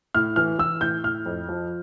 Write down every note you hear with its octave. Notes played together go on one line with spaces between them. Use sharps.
A2 F6
E3 F6
E3 E6
A2 G6
A2 F6
F2
F3